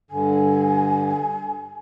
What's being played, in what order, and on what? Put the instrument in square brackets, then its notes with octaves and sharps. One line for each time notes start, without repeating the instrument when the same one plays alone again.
[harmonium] G2 D3 [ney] G#5